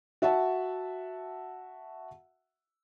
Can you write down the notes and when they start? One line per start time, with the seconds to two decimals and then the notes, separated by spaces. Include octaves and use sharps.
0.22 F#4 E5 F#5 A5